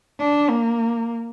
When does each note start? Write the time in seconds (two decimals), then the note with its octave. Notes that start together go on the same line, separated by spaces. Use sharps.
0.20 D4
0.50 A#3